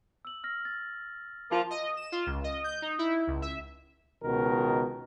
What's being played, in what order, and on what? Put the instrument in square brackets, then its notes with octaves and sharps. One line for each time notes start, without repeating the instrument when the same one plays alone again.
[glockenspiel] E6 F#7
F6 A#6
A6
[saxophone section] F3 A#3 F4
[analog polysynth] D#5
E7
F4
C#2
D#5
G6
D#4
E4
C#2
E5
[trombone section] C#2 B2 D#3 A#4